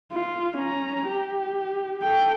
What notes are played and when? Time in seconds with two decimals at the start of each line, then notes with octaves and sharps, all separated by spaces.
0.13 F4
0.57 C#4 A#5
1.08 G4
2.02 A4 G5